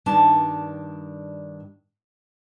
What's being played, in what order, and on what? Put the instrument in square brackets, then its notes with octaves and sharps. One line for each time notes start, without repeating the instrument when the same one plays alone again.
[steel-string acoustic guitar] G2 D#3 D4 A5